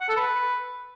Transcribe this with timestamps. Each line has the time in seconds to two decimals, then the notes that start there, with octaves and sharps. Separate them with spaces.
0.01 F#5
0.09 A4
0.17 B4